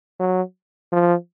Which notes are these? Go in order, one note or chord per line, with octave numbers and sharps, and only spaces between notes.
F#3
F3